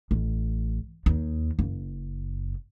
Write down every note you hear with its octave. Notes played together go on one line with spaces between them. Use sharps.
A1
D#2
F#1